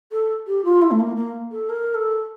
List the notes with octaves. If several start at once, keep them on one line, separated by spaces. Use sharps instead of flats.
A4
G4
F4
E4
A3
A#3
A#3
A4
A#4
A4